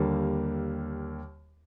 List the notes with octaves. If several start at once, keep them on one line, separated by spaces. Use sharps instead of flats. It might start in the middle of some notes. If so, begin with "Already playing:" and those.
Already playing: D#2 D3 G3 A#3